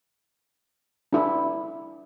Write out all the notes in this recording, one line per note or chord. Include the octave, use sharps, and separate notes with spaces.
D4 E4